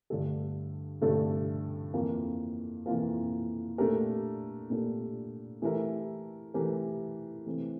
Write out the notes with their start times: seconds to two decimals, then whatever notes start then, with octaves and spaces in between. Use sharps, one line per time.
0.10 G2 D3 A3 D4 A4
1.02 G2 D3 A3 D4 A4
1.93 F2 E3 A#3 F4 A#4
2.86 F2 E3 A#3 F4 A#4
3.78 A#2 A3 D4 G4 A#4
4.70 A#2 A3 D4 G4 A#4
5.62 E3 A3 E4 G4 A#4
6.54 E3 A3 E4 G4 A#4
7.46 C3 E3 A3 C4